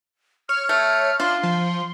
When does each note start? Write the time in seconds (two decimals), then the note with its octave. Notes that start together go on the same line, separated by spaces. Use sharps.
0.49 C#5 F6
0.69 A3 F6
1.20 D4 F4 C6
1.43 F3